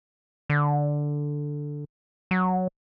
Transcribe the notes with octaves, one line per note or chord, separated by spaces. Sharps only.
D3
F#3